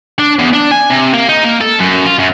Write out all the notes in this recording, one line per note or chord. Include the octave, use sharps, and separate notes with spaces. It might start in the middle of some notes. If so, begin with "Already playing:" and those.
D4
E2
D4
G#5
C3
A#3
D#4
A#3
A4
F#2
F4
F#2